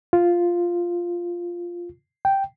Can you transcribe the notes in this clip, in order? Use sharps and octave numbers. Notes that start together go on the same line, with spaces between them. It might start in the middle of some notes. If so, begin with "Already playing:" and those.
F4
G5